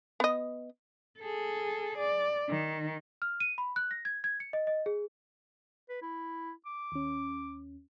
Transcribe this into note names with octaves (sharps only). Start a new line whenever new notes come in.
B3 D#5
G#4 A4
D5
D#3
F6
D#7
B5
F#6
A#6
G#6
G#6
C#7
D#5
D#5
G#4
B4
E4
D6
D#2 C#4